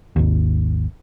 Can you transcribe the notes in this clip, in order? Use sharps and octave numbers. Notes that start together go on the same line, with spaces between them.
G#1 D#2